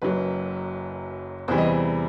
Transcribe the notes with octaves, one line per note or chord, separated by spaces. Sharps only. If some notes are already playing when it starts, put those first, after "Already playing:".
F#1 F#2 F#3 B4
E2 C3 E3 G3 C4 C5
D#5
C5